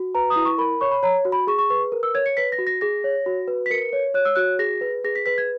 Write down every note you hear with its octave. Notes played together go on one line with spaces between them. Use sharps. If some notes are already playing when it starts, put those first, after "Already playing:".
Already playing: F#4
B4 A#5
D#6
E4
C#6
A#4 B5
C#5 C#6
B5
C#5 A#5
F#4
B5
G#4 C#6
C#6
B4 C#6
A#4
E6
C#5 G#6
C#7
B4 B6
A#6
F#4
A#6
G#4 A#6
C#5
F#4
B4
B6
A#4 C#7
C#5
C#5 F#6
E6
F#4 F#6
G#4 A#6
B4
G#4 A#6
B6
B4 B6
G#6